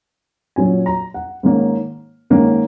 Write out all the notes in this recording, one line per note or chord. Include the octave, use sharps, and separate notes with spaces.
A#2 F#3 C#4 G#5
A#5
F#5
G#2 D#3 A#3 C#4
G#2 D#3 A#3 C#4